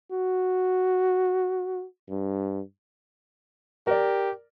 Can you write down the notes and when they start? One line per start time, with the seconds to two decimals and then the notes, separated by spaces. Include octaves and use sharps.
0.12 F#4
2.10 G2
3.87 G4 A#4 D5